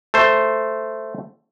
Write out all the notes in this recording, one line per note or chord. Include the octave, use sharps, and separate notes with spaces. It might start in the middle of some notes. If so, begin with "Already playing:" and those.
A3 C5